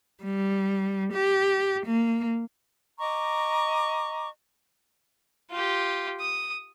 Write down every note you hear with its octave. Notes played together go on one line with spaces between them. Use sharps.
G3
G4
A#3
D#5 A#5 C#6 D6
F4 G4
D#6